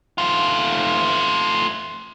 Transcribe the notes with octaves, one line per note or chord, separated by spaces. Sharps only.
A3 F4